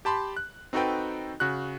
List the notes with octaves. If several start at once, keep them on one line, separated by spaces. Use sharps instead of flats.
G4 A5 B5 C6
F#6
C4 D#4 F#4 A4 B4 G5
C#3 F#4 F#6